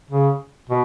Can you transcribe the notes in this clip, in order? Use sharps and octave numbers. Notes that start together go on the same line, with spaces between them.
C#3
B2